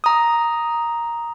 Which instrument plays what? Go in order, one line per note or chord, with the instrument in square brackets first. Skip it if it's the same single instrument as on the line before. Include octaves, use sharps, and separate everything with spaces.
[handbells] A#5 D#6